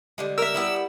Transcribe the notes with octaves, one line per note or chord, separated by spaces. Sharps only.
D3 G3 G#3
A#4 E5 E6
G3 B3 E4